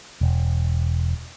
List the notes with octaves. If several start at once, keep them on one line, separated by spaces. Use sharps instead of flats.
E1